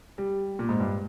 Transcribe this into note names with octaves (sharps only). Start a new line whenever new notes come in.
G3
A#2
G#2
G2